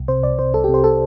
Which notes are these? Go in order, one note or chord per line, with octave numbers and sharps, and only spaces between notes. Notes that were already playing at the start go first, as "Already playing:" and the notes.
Already playing: C2
C3 C5
C2 D5
C3 C5
C2 A4
G4
C3
C5
A4